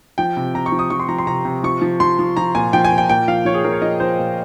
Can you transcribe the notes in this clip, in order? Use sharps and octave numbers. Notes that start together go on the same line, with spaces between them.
F3 G5
C3
C3 A#5
C#6
F3
D#6
F3 C#6
C6
F3 A#5
C6
C3 A#5
C3
F3 C#6
F3
F3 C6
F3
F3 A#5
A#2 G#5
F3 G5
G#5
A#2
G5
A#2 G5
F3 F5
F3 C#5
G#4
F3 A#4
C#5
F3 D#5
F3 C5
A#2